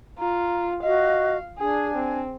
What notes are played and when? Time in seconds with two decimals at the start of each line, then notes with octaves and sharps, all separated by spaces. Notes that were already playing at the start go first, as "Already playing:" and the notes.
0.19 F4 A#5
0.83 F#4 D#5 F5
1.58 D4 G#4 G#5
1.95 C4